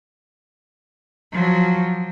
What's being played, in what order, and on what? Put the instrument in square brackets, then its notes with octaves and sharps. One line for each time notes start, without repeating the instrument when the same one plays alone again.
[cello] F3 F#3